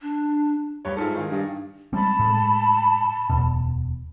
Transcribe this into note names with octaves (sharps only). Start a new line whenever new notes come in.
D4
G2 G4 C#5
G#2 E4 F4 A4
D#3 F5 G#5
G2
G3 G#3 C4 A5 B5
A2 G#3
D1 E2 B2